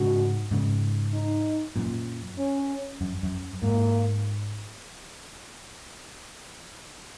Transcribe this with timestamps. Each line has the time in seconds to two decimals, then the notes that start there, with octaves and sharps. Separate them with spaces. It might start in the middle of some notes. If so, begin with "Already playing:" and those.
Already playing: G#2 C#3 F#4
0.51 G#2 C#3
1.14 D#4
1.76 F#2 A#2
2.38 C#4
3.01 F#2
3.23 F#2
3.62 G#2 A#3